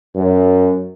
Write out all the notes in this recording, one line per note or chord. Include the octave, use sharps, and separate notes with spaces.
F#2